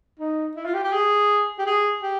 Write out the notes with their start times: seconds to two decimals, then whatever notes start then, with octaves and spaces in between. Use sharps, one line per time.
0.19 D#4
0.56 E4
0.65 F4
0.74 G4
0.84 G4
0.93 G#4
1.58 G4
1.66 G#4
2.02 G4